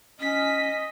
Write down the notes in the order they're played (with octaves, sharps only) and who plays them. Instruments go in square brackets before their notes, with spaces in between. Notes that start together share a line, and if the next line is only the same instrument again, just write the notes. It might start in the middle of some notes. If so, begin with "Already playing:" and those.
[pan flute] C#4 [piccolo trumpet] D#5 [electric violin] B6